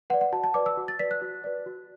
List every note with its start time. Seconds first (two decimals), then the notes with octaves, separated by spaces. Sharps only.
0.10 B4 F#5
0.14 D5
0.21 F#5
0.32 F#4 A5
0.44 A5
0.54 B4 D5 D6
0.66 E6
0.77 F#4
0.88 A6
0.99 B4 D5 B6
1.11 F#6
1.22 F#4
1.44 B4 D5
1.66 F#4